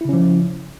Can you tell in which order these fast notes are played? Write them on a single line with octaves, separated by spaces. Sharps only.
E4 C#3 C#4 F3